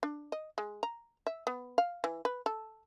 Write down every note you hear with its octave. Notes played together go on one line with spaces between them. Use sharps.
D4
D#5
G#3
A#5
E5
B3
F5
E3
B4
A4